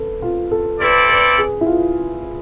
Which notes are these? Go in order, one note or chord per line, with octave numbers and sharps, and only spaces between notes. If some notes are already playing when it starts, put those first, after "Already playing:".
Already playing: A4 B4
F4
A4
C4 E4 A4 B4 D5
B4
G#4
E4
F4